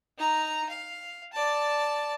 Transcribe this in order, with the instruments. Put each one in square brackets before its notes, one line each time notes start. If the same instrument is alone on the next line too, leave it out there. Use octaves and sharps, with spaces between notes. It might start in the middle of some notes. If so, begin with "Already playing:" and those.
[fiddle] D#4 A#5
F5
D5 A5